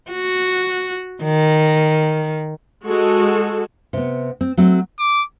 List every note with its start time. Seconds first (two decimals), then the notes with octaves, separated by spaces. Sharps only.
0.11 F#4
1.23 D#3
2.84 G#3 F#4 A4
3.93 C3 B3
4.41 C4
4.57 F#3 A3 C4
4.99 D6